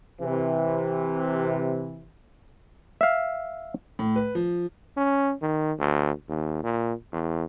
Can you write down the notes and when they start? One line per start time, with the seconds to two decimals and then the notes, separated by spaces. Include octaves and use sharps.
0.22 C3 E3
3.01 E5 F5
3.99 A2
4.16 B4
4.35 F3
4.97 C#4
5.42 D#3
5.79 D2
6.28 D#2
6.63 A#2
7.13 E2